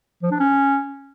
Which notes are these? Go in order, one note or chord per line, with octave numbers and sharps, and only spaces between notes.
F3
D4
C#4